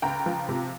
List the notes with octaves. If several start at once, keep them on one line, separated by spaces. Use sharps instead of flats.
C#2 G5 A#5
F3
C3